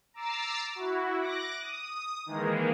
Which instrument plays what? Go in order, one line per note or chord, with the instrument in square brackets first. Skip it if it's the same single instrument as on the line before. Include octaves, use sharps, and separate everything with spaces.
[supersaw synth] A#5 D6 E6 A6 C7
E4 F#4
D6 F#6 A#6
D#6
D#3 E3 G#3 A#3